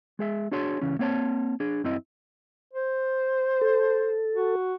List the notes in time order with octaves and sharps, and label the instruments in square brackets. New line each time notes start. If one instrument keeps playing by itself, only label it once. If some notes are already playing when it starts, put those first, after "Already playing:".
[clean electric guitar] G#3 G#4 E5
D4 F#4 G#4 C#5 A5 C6
C#2 C#3 E3 C#4
A#3 C4 C#5 F5 A5
D4 G#4
F#2 C4 E4 D#5
[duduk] C5
[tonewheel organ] A4
[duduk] F#4